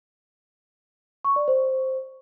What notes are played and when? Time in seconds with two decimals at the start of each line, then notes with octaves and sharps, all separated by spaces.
1.25 C#6
1.36 D5
1.48 C5